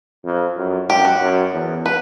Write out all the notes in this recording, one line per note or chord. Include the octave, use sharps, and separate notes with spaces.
F2
F#2
F#2 G4
F#4
F#2
E2
B4